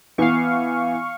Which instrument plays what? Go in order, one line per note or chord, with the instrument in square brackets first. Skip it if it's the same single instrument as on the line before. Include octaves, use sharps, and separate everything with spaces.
[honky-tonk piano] E3 B3 [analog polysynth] F5 C#6